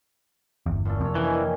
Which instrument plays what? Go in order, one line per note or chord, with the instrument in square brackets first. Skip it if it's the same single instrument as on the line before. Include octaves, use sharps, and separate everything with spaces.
[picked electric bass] G1 E2
[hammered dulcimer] F#2 A#2 A4
[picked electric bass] F2 C3 [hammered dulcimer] D4 C#5
[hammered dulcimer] D#3 C#4 G4 [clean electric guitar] E3